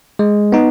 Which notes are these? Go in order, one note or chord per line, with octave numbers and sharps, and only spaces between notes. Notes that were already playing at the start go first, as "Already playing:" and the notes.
G#3
B3 D#4